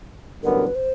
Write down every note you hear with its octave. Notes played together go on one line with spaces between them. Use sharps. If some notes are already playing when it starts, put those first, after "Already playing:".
A1 G2 D3 F#3 B3 A#4
B4
C5